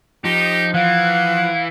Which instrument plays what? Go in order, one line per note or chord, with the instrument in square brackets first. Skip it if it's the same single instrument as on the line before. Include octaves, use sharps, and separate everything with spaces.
[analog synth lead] F3 [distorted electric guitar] D#4 [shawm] G4
[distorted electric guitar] E3 [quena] F5 [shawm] F#5